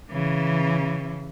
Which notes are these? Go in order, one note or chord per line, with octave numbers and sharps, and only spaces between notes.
C#3 E3